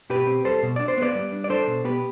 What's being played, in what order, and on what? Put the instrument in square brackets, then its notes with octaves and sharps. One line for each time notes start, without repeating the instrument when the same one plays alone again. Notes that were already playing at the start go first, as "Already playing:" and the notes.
[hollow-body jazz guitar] B2 G4 B4
C4
G3 A4 C5
B2
D4 D5
C5
B3 B4 D5
G3
D4
D5
D4 A4 C5
B2
B3 G4 B4